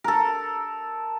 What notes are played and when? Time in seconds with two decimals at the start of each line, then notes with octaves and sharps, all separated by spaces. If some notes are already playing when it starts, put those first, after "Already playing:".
0.04 A4 A#4